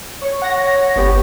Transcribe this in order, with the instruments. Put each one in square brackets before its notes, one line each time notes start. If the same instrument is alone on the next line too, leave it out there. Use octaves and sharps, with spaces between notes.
[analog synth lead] C#5
[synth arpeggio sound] F#5 A#6
G1 B3 G4